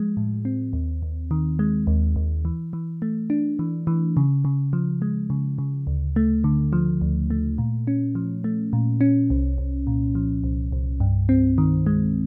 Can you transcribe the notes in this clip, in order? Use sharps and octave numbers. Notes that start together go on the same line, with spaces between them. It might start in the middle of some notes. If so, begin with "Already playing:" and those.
Already playing: F3 G#3
A2
C4
D#2
D#2
D#3
G#3
D#2
D#2
E3
E3
A3
D4
E3
E3
C#3
C#3
F3
G#3
C#3
C#3
D2
A3
D3
F3
D2
A3
A#2
C#4
F3
A3
A#2
C#4
C2
C2
A#2
F3
C2
C2
G2
C4
D#3
G#3